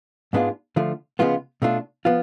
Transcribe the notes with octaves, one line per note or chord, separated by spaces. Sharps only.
G#2 G#3 B3 D4 F4
D3 F3 A3 F4
C#3 F3 G#3 B3 F4
B2 A3 D4 F4
F3 B3 F4